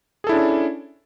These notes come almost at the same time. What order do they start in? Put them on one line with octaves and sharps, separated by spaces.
G#4 A4 E4 D4 C#4